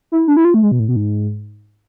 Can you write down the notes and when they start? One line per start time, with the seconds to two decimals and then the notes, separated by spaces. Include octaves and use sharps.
0.12 E4
0.28 D4
0.37 E4
0.45 F4
0.54 A3
0.62 G#3
0.72 B2
0.79 A2
0.88 B2
0.96 G#2